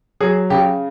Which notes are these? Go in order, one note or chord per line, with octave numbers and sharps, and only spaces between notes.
F#3 G#4
C#3 G4